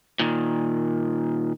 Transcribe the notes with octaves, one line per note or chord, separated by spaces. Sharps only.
A#2 D#3